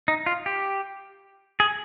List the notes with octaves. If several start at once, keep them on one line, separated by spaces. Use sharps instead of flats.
D#4
F4
G4
G#4